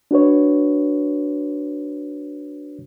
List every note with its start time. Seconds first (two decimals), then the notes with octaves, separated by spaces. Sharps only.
0.11 D4 F#4 B4 C#5